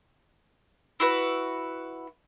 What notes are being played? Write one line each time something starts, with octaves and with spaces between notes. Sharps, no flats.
E4 F#4 B4